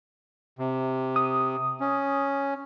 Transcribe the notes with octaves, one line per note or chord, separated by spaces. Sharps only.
C3
D#6
C#4